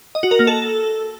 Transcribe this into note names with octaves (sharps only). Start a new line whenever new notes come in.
D#5
F#4
A#4
A#3
A4